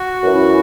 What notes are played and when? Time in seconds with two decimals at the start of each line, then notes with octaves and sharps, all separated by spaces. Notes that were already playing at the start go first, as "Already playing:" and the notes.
Already playing: F#4
0.23 F#2 E3 C#4 E4